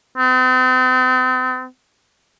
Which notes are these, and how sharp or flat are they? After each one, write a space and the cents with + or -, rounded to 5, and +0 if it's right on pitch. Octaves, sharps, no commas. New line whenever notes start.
C4 -40